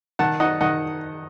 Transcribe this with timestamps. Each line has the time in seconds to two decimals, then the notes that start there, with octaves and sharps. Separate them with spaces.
0.19 D#3 F#5 A5
0.40 D#4 D#5 F#5
0.61 D#3 D#5 F#5